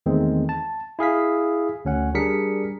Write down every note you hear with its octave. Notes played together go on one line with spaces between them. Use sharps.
E2 D#3 G#3 A3 C4
A5
E4 G#4 F5 B6
D2 C#4 F#5
G3 D4 G#4 A#4 B6 C#7